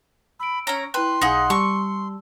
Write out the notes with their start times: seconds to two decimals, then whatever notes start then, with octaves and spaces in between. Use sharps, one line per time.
0.40 B5 E6 D7
0.67 C#4 C#5 A#5
0.94 E4 B4 G5 C6
1.22 B1 D#4 G#4 F5 F#5 G#5
1.50 G3 A5 C#6 E6